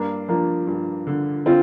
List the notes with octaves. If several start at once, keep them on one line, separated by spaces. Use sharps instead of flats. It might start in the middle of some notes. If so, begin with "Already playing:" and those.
Already playing: G2 A#3 D4
F3 A#3 D4
G2
D3
D3 C4 F4